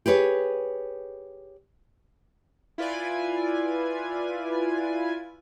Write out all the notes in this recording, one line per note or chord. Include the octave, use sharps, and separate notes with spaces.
G4 G#4 B4 C#5
E4 F4 B4 D5 G#5